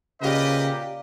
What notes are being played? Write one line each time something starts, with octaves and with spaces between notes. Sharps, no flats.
A#2 C#3 G4 B4 D5 D#5 F5 A#5